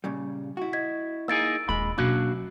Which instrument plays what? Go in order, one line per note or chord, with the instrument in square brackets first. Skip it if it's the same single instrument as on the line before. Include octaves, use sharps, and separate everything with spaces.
[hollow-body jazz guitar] A#2 C#3 G3
E4 F#4
[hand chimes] D#5 G#6 B6
[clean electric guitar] A#3 D#4 G#4 [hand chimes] E6 A6 D7
[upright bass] D#1 D4 [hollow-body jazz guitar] A#2 G#3 [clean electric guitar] B5
[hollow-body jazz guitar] F#2 [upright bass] B2 [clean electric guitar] A#3 D4 F#4